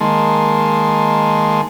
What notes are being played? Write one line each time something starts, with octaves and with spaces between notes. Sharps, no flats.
D#3 G#3 A#3 A5 C6